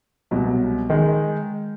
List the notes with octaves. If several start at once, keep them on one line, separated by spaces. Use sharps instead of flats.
C2 B2 F#3
D#3 G#3